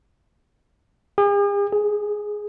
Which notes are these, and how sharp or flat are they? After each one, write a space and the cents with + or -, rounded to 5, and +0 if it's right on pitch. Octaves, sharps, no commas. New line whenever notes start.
G#4 -45
G#4 +5